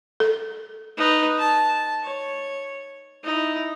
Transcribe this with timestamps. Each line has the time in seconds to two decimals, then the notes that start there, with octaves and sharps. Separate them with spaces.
0.20 A4
0.97 D#4 B4
1.39 A5
2.03 C#5
3.24 D#4 E4